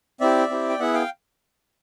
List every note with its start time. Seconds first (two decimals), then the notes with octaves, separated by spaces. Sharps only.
0.21 C4 E4 G4 D5 E5
0.50 C4 E4 G4
0.69 G5
0.79 B3 E4 G#4 E5 F#5
0.94 F5 G5